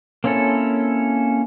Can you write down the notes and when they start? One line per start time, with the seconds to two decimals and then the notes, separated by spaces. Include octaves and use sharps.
0.24 A#3 C4 C#4 E4 A4